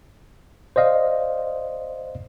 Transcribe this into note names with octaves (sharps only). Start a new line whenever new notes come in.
C5 D5 D#5 F5